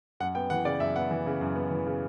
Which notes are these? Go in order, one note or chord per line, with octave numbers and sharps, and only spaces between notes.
F#2 F#5
B3 G5
E3 F#5
C#3 D5
F#2 E5
B3 F#5
E3
C#3
F#2
B3
E3
C#3